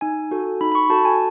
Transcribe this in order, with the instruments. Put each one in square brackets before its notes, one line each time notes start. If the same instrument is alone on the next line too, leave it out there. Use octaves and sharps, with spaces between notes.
[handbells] D#4 G#5
F#4 A4
D#4 B5
B5
C#6
F#4 A4 A5
G#5